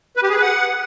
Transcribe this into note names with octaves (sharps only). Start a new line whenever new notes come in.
B4
G4
G#4
B4
F#5